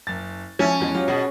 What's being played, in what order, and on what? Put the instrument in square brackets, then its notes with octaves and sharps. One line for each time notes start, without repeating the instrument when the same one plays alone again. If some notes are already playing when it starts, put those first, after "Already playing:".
[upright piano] F#1 A6
[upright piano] F3 E5 [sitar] C#4
[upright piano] E2 F3 G#3
F#3 F4 G4
[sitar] B2 [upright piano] G#4 D#5